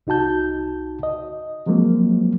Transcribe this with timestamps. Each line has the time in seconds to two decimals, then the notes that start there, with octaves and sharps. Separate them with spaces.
0.07 C2 D#4 F#4 A5 G6
1.03 D#5
1.66 F3 F#3 G#3 A#3 C4